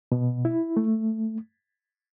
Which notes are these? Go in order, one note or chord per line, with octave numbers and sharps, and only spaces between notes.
B2
E4
A3